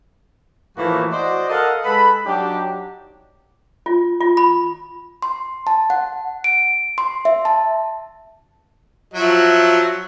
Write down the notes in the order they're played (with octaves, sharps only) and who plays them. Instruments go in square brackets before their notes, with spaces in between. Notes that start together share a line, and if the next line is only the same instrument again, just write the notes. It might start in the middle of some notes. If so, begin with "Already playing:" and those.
[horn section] A2 E3 F3 A3 A#3 F#4
F#4 C5 D5 D#5
A4 A#4 D#5 F5 F#5 A5
G#3 A4 B4 B5
F#3 D4 D#4 G4
[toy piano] F4
F4
B5
[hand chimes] C6
A5
F#5
D7
C6
E5
A5
[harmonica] F3 F#3 E5